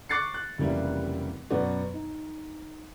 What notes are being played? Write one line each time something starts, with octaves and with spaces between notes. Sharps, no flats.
C#6 D6 F#6 A6 C7 C#7
F#6
F1 C#3 E3 G3 A#3 E4
F#2 B2 B3 F#4 D5
D#4